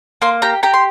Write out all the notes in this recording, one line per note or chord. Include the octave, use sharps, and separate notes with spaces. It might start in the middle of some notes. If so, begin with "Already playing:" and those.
A#3 C6
G4 A#5
G4 A#5
C6